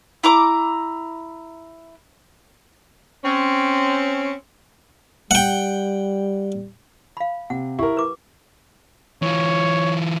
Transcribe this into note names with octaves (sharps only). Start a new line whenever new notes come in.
E4 A#5 D6
C4 C#4
G3 F#5 G5
F5 B5
C3 F#5
E4 G4 A#4
B4 D6
E3 F4 C#5